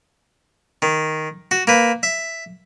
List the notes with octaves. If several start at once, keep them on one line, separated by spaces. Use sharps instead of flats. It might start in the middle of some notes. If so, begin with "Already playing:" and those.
D#3
F#4
A#3 B4
E5